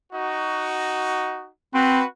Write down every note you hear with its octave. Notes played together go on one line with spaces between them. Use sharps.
D#4 F#4
C4 F#4 B4